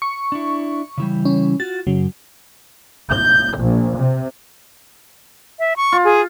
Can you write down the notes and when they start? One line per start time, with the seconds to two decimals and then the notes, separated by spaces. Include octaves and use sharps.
0.02 C#6
0.32 D4 E4
0.98 C#3 E3 G3
1.25 C#4
1.60 F4 F#4 A6
1.87 F#2 C#3 F#3
3.13 G6
3.62 A#1
3.98 C3
5.59 E5
5.77 C#6
5.92 F4
6.04 G#4